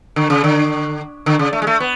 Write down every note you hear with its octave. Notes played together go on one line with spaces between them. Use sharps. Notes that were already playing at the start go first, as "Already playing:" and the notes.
D3
C#3
D3
D3
C#3
A3
G#3
A3
B3